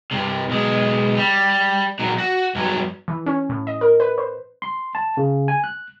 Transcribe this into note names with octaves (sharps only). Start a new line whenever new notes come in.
G2 C3
B1 G#3
G3
A#2 F#3
F#4
G2 F#3
E3
C#4
A2
D#5
A#4
B4
C5
C6
A5
C#3
G#5
F#6